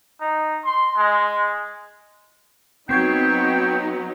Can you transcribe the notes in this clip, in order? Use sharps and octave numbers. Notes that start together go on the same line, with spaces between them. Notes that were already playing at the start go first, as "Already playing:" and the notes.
D#4
C6
G#3
F#3 B3 C4 D#4 G5 C#6 G#6